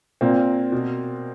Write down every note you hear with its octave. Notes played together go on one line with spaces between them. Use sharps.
A#2 A#3 C4
B2